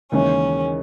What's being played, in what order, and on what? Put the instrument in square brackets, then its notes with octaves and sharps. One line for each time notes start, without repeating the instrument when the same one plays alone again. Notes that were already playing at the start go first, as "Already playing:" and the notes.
[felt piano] D#2 C#3 E3 G#3 D#4 [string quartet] C#4